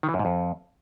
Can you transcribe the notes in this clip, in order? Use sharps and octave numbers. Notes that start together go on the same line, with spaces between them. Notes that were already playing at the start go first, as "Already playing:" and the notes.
D#3
E3
F#2
G#2
F2